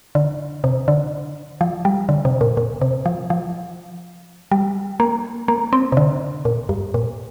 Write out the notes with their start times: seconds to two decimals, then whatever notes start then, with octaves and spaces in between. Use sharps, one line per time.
0.15 D3
0.64 C3
0.88 D3
1.61 F3
1.85 G3
2.09 D3
2.25 C3
2.41 A#2
2.57 A#2
2.81 C3
3.06 F3
3.30 F3
4.51 G3
5.00 A#3
5.48 A#3
5.73 C4
5.92 C3
5.97 D3
6.45 A#2
6.69 G2
6.94 A#2